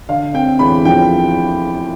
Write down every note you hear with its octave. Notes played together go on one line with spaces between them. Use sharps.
D3 F5
C4 G5
E2 B5
F3 G5